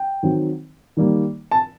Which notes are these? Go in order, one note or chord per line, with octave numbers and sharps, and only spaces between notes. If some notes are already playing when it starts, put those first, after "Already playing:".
Already playing: G5
D#3 F#3 C4
D#3 G3 A#3
A5